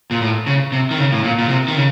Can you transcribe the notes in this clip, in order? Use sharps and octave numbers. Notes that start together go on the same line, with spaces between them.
A#2
A2
C#3
C3
D#3
C#3
A2
A#2
A#2
C3
D#3
C#3